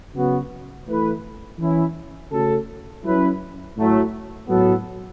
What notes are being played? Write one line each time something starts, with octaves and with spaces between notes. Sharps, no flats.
C#3 F#3 B3 F#4
E3 A3 E4 B4
E3 C#4 E4
C#3 A3 C#4 F#4 A4
F#3 C#4 E4 B4
A2 F#3 A3
A2 F#3 B3 A4